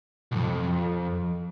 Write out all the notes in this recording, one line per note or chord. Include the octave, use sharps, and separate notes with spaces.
B1 F2